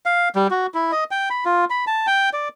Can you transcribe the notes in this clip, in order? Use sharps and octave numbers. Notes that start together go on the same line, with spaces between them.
F5
G3
F#4
E4
D#5
G5
B5
F4
B5
A5
G5
D5